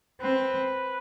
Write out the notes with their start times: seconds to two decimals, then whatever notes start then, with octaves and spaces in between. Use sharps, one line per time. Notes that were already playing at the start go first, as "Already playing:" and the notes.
0.21 C4 B4